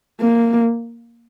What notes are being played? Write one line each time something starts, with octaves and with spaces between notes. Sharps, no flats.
A#3